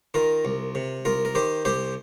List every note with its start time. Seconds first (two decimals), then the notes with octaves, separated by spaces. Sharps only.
0.14 D#3 F4 A#4
0.45 C2
0.75 C3
1.05 C2 F4 A#4
1.25 A#4
1.35 D#3 G4 C5
1.65 C2 G4 C5